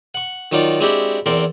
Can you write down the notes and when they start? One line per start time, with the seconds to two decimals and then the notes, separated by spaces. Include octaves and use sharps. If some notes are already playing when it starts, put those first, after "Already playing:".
0.15 F#5 C#6
0.52 D#3 F#3 D#4 F4 D5
0.80 G#3 C4 D4 E4 F#4 G4
1.26 E2 C4 A#4 D5 C6 C#6